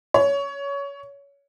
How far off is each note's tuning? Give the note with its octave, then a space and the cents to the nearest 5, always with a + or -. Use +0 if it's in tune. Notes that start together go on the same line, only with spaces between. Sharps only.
C#5 +20